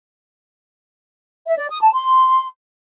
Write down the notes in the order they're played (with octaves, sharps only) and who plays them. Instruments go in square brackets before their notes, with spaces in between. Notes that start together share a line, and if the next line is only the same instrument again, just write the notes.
[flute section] E5
D5
D#6
A5
C6